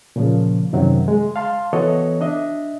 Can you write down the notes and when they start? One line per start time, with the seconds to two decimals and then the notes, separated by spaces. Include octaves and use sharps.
0.16 A#2 C#3 F3
0.73 F#2 C3 D#3 F#3
1.08 G#3
1.36 F5 A5 C6
1.73 E3 B3 F#4 A4 C#5 D#5
2.21 D4 D#5 E5